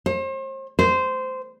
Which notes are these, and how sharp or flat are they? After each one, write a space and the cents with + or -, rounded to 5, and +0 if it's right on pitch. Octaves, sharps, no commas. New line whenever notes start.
C5 +40
C5 -15